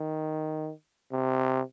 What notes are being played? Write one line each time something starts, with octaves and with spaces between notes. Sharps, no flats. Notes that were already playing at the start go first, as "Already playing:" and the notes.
Already playing: D#3
C3